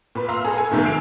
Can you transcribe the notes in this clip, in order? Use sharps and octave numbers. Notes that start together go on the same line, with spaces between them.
A#2 B4
F5 A#5 C6 E6
G#4 A4 A#5
G#5
A#1 G#2 B2 D#3 A3
G#5 E6 C7 D7 F7